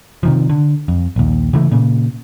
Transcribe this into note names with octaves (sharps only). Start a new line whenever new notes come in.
C3 D#3 F3
D3
F2
A#1 D#2
C#3 E3 A3
A#2 C#3